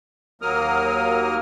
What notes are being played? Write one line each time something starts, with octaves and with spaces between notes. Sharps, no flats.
D#2 F#3 A#3 A#4 D#6 F6